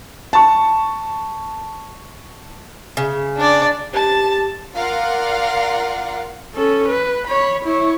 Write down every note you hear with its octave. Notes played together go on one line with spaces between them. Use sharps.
A5 C#6
C#3
D4 D5
G4 A5 A6
F4 A#4 D5 F5 F#5
C#4 A4
B4
C#5 B5
E4 C#5